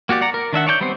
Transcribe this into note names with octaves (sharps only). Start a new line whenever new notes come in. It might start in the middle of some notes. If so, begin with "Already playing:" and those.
A#3 F#4 G4 D5
D5 F#5 A#5
A#4
D#3 D4 E5 F#5
C#5 D5 A5 G6
G3 B3 C4 C5